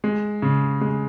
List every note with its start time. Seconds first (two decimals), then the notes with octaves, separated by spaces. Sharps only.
0.04 G#3
0.42 C#3
0.81 G#3